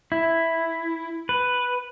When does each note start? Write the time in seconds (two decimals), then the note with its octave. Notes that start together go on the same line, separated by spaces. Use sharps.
0.12 E4
1.29 B4